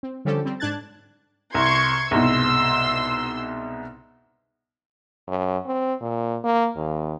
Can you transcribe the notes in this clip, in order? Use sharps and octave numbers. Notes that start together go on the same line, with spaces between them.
C4
D3 F3 G3 C#4 G4 A4
G3 C4
G#2 D4 A5 F#6 G#6 A6
C2 C6 C#6 G#6
C2 G#2 B2 C6 E6
F#2
C4
A#2
A#3
D#2